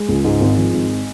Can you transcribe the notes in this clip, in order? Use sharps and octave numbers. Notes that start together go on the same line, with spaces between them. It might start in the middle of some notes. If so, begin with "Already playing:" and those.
Already playing: G#3
C#2
G#2
G#1
F3
G#1